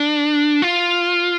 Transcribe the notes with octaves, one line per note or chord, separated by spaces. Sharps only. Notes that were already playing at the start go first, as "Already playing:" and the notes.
Already playing: D4
F4